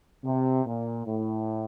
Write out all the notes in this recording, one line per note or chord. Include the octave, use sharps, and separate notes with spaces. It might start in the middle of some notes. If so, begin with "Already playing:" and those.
C3
A#2
A2